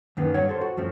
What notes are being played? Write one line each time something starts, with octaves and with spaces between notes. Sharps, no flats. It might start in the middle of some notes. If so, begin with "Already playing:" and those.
F#2 D#3 A#3 B3
G2 C#5 F#5
A4 C5
F#4
F#2 F3 A3 C4